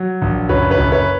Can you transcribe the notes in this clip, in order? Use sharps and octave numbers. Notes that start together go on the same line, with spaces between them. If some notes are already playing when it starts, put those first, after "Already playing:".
Already playing: F#3
A#1
F#1 B4 C#5
B4 C#5
F#1
B4 C#5